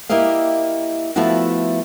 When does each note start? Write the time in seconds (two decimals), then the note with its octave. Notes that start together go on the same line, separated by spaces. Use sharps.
0.09 A#3 E4 G4 D#5 F5
1.16 F3 A3 B3 E4 F#4